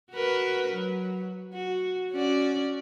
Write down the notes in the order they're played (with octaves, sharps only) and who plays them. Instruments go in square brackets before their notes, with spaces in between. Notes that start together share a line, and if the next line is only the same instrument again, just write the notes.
[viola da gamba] F#4 A#4 B4
F#3
F#4
C#4 F#4 D5